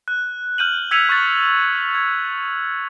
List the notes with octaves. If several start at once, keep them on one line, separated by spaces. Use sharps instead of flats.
F#6
F6 G6 D#7 F#7
E6 G#6 B6 C#7 D#7 F7
C#6 F#6 A6
G#6